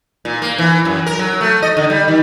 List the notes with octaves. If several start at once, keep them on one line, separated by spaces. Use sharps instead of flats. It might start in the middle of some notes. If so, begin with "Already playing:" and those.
A#2
A#3
E3
F#2
A#4
F#3
A3
D#5
D3
G3
D#3